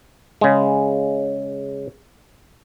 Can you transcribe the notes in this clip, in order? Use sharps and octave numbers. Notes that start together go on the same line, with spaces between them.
C#3 G#3